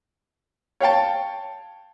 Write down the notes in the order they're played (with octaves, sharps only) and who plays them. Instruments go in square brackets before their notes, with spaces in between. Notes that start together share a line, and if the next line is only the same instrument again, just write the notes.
[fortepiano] C#5 F5 G5 A5